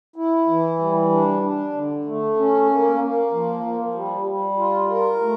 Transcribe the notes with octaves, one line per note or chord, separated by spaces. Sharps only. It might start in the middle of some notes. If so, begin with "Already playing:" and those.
E4
E3
G3
D4
D4
D3
A3
C#4
A#3
A#3
F3
F3
G3
G3
F4
A#4
A3